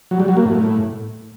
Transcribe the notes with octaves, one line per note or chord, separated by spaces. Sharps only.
F#3
G3
F#3
A#3
A2